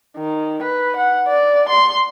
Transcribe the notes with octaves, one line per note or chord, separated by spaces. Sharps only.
D#3
B4
F#5
D5
C6